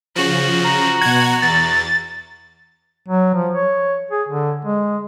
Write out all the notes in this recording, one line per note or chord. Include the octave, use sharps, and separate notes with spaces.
C#3 F3 F#4
A#5
B2 F#5 G#6
E2 A6
F#3
F3
C#5
G#4
D3
G#3